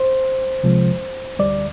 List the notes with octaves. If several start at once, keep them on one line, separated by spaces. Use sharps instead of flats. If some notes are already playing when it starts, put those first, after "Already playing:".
Already playing: C5
C2 C3 F3 G#3
D2 D3 G3 D5